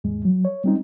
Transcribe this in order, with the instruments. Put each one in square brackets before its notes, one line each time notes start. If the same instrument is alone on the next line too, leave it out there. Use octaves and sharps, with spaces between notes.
[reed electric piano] D#2 G#2 G#3
F#3
C#5
G3 G#3 C4 C#4 D#4